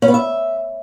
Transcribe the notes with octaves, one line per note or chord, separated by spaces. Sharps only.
C#4
B3
E5